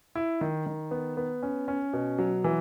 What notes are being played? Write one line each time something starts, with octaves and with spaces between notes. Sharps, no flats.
E4
D#3
D#3
B3
B3
C#4
C#4
B2
F#3
E3